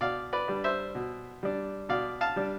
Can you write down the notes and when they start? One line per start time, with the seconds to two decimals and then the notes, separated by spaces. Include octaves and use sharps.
0.01 B2 D5 F5
0.33 B4 D5
0.48 G3 D4
0.64 C5 E5
0.95 B2
1.43 G3 D4
1.89 B2 D5 F5
2.21 F5 A5
2.36 G3 D4